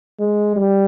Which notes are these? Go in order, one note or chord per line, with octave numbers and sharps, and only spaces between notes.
G#3
G3